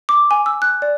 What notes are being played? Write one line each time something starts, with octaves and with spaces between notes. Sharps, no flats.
D6
G#5
E6
F#6
D5